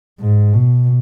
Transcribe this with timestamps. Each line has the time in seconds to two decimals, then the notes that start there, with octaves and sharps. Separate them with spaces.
0.20 G#2
0.54 B2